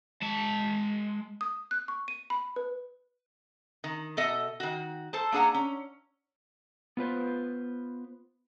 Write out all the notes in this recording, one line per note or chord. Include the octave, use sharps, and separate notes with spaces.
G#3 A5
D#6
F#6
C#6
D#7
B5
B4
D#3
B2 A4 D#5 E5
D#3 F#4
A4 C5 A5
A#3 D4 G#4 F#5 A#5
C#4
B3 F4 B4 C5